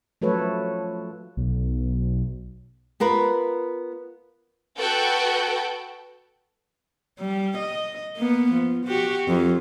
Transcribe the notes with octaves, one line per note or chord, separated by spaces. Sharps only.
F3 F#3 A3 A4 B4 C#5
B1
B3 F4 A#4 B4
F#4 A4 B4 F#5 G5
G3
D#5
A#3 B3
F3
F#4 G4
F2